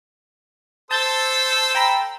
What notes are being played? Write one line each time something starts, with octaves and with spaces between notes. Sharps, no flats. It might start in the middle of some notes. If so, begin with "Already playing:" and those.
A4 C5 A5 E6 G6 A6
G5 A#5 B5